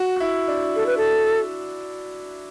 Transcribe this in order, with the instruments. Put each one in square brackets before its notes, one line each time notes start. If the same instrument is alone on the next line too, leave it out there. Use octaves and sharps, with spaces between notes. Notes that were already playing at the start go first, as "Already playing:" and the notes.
Already playing: [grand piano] F#4
F#4
E4
D4
[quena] A4
B4
A4